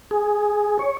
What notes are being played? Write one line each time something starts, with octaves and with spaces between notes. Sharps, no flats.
G#4
C#5